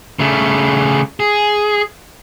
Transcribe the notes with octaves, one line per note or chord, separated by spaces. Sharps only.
C#3 A3
G#4